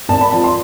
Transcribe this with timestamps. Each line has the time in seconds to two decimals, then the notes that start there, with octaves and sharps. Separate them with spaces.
0.09 G#1 A5
0.21 B5
0.32 F3 A5
0.44 C6